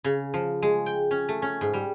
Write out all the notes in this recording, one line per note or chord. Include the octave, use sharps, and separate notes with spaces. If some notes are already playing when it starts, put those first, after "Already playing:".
C#3
F3
G#3
G5
C#4
A3
C#4
G#2
G3